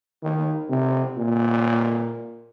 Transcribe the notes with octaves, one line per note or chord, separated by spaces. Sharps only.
D#3
C3
A#2